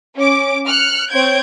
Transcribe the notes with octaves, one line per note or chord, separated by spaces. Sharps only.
C#4 D6
F6 F#6 C#7
C4 C#5 G6 G#6 D7